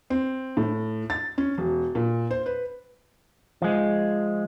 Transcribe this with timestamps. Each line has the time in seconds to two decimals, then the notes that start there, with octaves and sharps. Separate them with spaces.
0.10 C4
0.57 A2
1.10 A6
1.38 C#4
1.58 E1
1.95 A#2
2.31 C5
2.46 B4
3.62 F3 G#3